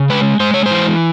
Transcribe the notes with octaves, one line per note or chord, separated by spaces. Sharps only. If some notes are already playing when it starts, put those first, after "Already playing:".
Already playing: C#3
G#3 B4
G#3 C5
C#5
C5
E3